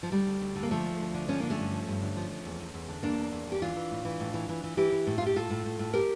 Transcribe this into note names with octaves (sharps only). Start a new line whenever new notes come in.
F3
D2 G3
D2
D2
D3
A#3
D2 F3 A3
D2
D2
D3
F3 C#4
D3 A#3
A3 C#4
G2
F3
G2
D3
F3
F3
E2
E2
E2
D3
E2 A#3 D4
E2
E2
E2 G4
E3 D4 F4
E3
A2
E3
A2
E3
E3
E3
E3 E4 G4
E3
A2
F4
A2
G4
A2 F4 A4
A2
A2
A2
G4 A#4